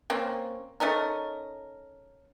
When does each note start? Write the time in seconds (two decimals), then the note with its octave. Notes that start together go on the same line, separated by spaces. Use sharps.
0.10 A#3 C4 C#4
0.80 A3 C#4 D#4 A#4